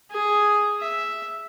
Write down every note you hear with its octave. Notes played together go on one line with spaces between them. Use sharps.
G#4
E5